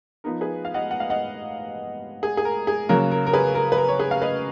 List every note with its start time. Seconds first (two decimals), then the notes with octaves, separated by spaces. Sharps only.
0.24 F3 B3 D#4 A#4
0.41 G#4 B4
0.65 F5
0.74 D#5 F#5
0.91 F#5
1.00 F5
1.10 D#5 F#5
2.23 G#4
2.37 G#4
2.45 A#4
2.67 G#4
2.89 C#3 F#3 A#3 C#4 A#4
3.11 A#4
3.27 A#4
3.33 G#4 B4
3.55 A#4
3.72 B4
3.78 A#4
3.89 C#5
3.99 G#4 B4
4.11 F5
4.22 B4 D#5